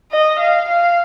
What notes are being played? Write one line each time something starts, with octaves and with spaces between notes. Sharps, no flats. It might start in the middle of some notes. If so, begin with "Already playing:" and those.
D#5
F5
F5